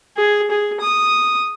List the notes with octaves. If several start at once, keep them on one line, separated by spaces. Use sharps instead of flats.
G#4
G#4
D#6